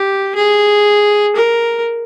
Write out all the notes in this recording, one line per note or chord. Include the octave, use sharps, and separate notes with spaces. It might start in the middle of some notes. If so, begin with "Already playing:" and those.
Already playing: G4
G#4
A#4